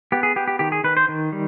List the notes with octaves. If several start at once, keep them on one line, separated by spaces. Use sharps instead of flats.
B3 G4
G#4
B3 G4
G4
D#3 G4
G#4
D#3 B4
C5
D#3
G3